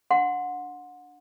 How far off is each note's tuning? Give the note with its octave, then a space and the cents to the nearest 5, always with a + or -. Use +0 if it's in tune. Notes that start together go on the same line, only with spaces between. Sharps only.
D4 +0 F#5 -25 C6 +0